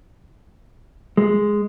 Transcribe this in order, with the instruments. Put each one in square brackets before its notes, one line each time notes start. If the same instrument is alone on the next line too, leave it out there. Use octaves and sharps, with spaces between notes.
[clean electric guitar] G#3